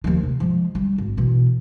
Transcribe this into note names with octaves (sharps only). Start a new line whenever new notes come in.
D#2 F3
C3
F3 G#3
G3
G#1
B2 E3